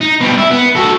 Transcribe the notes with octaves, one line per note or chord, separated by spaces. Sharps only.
D#4
B2 G3
E4
B3
F#4 A4